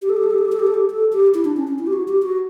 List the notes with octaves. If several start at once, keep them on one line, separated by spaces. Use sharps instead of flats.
G4
A4
G4
A4
G4
A4
G4
A4
G4
A4
G4
A4
G4
E4
D4
C#4
C#4
E4
G4
F#4
G4
F#4